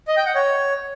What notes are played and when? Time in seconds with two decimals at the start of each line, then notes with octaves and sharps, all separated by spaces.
0.08 D#5
0.17 G5
0.26 F#5
0.35 C#5